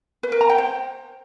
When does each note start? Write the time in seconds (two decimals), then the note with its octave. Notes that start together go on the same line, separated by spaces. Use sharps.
0.23 B4
0.32 A#4
0.41 A#5
0.49 G5
0.58 C5